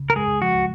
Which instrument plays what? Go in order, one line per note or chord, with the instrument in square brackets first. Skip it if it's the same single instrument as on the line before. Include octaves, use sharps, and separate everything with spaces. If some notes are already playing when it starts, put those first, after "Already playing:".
Already playing: [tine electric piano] C#3
[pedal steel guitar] A#4
[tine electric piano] G#3 [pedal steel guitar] G#4
[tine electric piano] F3 [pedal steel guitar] F#4